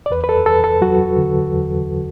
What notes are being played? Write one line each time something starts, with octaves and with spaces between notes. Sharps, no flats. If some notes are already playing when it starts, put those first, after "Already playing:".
D5
E2 B4
B4
A4
E2 A4
A4
F#3 F#4
D3
E2